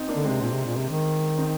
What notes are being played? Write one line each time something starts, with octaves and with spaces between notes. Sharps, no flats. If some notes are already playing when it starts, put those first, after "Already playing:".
Already playing: C4 D#4
A#3 D4
D3
C3 G#3 C4
A#2 G#3 C4
C3
A#2
C3
D#3
C4 D#4